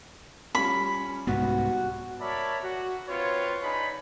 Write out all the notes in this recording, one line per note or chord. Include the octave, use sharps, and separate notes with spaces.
G3 C#4 F4 B5
C2 G#2 B3 F#4
A#4 C#5 D5 E5 A5 B5
F#4
C4 F4 B4 C#5
D4 D#4 G#4 B5